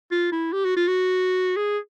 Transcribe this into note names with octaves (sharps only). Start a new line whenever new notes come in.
F4
E4
G4
F#4
F4
F#4
G#4